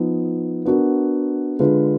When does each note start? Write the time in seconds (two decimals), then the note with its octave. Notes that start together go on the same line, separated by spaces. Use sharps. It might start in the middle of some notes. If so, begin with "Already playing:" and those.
Already playing: F3 B3 D#4
0.66 B3 D4 F#4 A#4
1.59 D3 G#3 D4 F4 B4